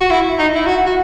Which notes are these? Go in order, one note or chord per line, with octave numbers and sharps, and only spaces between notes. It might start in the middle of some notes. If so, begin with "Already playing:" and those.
F#4
E4
D#4
E4
F#4
F#4